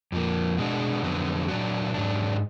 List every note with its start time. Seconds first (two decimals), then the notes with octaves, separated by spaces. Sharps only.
0.12 F2 F3 A#3
0.58 B2 G#3 D4 F#4
1.03 F2 D3 F#3 B3
1.48 A#2 F#3 D4 F#4
1.94 G#2 F#3 D4